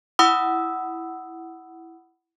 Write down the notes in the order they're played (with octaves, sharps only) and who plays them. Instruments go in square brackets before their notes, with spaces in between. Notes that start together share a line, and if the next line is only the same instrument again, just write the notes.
[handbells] E4 F#5 B5 D#6 E6